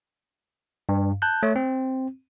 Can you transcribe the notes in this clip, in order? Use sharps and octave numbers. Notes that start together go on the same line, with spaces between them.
G2
A5 F#6 G6
A3 C#5
C4